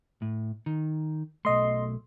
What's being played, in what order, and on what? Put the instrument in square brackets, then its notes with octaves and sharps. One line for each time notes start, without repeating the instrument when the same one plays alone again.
[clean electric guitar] A2
D#3
[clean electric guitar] B1 A3 [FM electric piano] D#5 C6